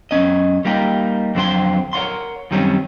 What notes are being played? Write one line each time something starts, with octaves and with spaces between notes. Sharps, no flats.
F#2 C#4 D#5
G3 A#3 D#4 G4
F2 D3 F#3 C5 G5 C6
A#4 C#5 D5 F#5 C6
F#2 D#3 G3 C4 C#4